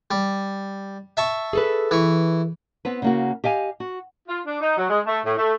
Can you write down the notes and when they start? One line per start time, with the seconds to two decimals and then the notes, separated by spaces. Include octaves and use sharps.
0.11 G3
1.17 E5 A5 C#6
1.53 G#4 A4 B4
1.91 E3 C#6
2.85 B3 C4 B4
3.02 C#3 A#3 F#4
3.44 G4 D#5 F5 G#5
3.80 F#4
4.28 F4
4.46 D4
4.61 D#4
4.77 F#3
4.89 G#3
5.06 A3
5.24 A2
5.38 A3